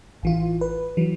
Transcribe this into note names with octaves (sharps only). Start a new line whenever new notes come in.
A1 E3 F4
B4
E3 F#3